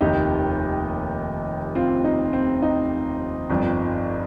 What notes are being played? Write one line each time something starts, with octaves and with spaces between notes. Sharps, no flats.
F1 D#2 D#3 D#4 G4
C4 F4
D#4
C4
D#4
G1 F2 F3